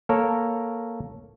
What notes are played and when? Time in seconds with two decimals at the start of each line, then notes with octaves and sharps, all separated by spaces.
0.09 A#3 A4 A#4 C#5